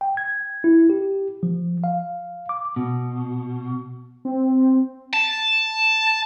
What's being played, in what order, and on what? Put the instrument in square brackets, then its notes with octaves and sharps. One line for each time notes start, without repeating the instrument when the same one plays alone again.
[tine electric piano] G5
G#6
E4
G4
F3
F5
D6
[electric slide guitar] B2
[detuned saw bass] C4
[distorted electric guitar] A5